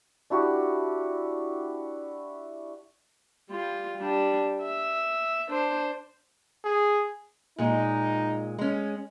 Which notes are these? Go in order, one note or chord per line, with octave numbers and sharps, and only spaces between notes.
D4 E4 F#4 G4
G3 F4
G3 D4
E5
D4 C5
G#4
A#2 G#3 D#4
G#3 C#4